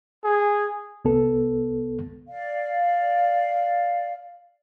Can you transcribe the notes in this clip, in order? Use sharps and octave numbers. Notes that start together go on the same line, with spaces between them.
G#4
C2 B3 A4
D5 F5